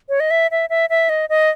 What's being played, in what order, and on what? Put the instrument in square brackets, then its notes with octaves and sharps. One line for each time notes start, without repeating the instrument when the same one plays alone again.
[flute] C#5
D#5
E5
E5
E5
E5
D#5
D#5